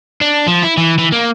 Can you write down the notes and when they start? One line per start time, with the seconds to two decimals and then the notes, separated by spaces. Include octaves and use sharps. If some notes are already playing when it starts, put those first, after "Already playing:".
0.21 D4
0.47 F3
0.63 E4
0.77 E3
0.98 E3
1.12 A#3